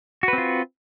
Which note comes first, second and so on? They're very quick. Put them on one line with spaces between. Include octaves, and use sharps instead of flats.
F#4 B4 C4 F4